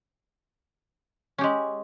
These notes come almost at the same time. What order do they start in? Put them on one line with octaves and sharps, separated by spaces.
C#4 G4 G#3